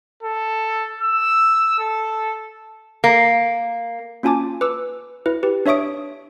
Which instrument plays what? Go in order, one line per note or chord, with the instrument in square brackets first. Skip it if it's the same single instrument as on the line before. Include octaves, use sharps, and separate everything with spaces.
[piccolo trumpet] A4
E6
A4
[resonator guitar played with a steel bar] A#3
[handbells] A#3 C#4 F4 G#5 A5 D6
B4 D6 E6
E4 B4
G4 B4
D4 C#5 E5 C#6 D#6 D7